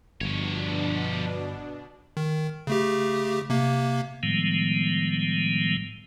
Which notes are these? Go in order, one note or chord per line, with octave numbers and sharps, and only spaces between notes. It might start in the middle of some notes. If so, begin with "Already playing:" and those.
G1 B2 F3 D4 C#5
D#3
C#3 A3 G4
C3 A#3
A2 D#3 F3 G3 G#3 B3